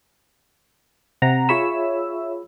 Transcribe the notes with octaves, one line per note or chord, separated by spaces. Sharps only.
C3 F#5 A#5
F4 G#4 C#5 E5 B5 E6